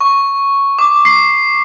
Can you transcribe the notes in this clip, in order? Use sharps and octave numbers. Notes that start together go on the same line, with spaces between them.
C#6
D6
C7